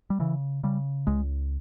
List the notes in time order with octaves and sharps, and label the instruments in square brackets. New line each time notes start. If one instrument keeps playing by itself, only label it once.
[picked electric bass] G3
C#3 E3
C#3 G3
C#2 G#3